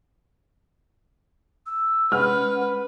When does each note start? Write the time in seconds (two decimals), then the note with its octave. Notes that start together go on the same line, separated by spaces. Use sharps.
1.66 E6
2.12 G#3 C#4 B4 F#5 F6